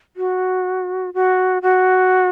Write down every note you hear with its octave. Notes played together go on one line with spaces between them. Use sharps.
F#4
F#4
F#4